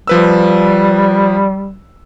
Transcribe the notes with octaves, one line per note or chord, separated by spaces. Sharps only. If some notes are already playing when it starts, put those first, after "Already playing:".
F3 G3 B4 E6